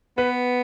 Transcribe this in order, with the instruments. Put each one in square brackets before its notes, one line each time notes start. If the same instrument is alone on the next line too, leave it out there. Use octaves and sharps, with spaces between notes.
[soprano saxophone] B3 [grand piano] B4